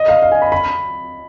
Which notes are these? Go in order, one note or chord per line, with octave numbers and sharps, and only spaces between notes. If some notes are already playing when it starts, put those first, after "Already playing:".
Already playing: D#5
F5
F5
G#5
B5
B5